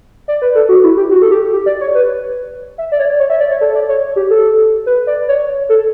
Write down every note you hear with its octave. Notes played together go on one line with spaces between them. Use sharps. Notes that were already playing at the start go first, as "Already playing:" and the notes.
D5
B4
A4
F#4
E4
G4
F#4
A4
G4
G4
D5
C#5
B4
E5
D5
C#5
D5
C#5
E5
D5
C#5
A4
D5
C#5
G4
A4
B4
D5
C#5
A4